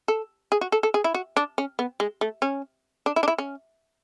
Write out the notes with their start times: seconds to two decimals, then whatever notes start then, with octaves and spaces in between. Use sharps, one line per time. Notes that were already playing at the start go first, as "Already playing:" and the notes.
0.08 A4
0.52 G#4
0.61 F#4
0.72 A4
0.83 A4
0.94 G#4
1.04 E4
1.14 F#4
1.37 D4
1.58 C#4
1.79 B3
2.00 G#3
2.21 A3
2.42 C#4
3.06 D4
3.16 E4
3.23 D4
3.28 E4
3.38 C#4